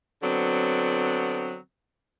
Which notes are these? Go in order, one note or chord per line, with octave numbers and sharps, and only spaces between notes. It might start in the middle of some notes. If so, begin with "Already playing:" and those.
D3 F#3 B3 C4